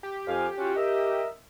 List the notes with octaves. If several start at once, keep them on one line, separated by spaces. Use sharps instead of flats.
G4
F2 F5 G#5
C#4 F4 F#4
A#4 D#5 E5